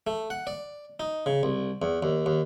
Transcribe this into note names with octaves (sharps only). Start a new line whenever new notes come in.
A3
F#5
D5
D#4
C#3
C2
E2
D#2
D#2